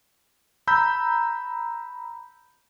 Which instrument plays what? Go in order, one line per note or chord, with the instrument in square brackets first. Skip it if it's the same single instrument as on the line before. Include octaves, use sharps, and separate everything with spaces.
[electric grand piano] A#5 B5 E6 G6